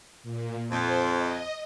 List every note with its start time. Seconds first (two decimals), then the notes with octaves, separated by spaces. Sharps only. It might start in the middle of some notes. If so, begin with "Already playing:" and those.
0.23 A#2
0.70 F2 C5
1.14 D#5